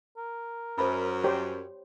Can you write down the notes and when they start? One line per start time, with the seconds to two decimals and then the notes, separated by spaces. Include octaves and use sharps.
0.17 A#4
0.78 F#2 C5 B5
1.24 G4 C5 C#5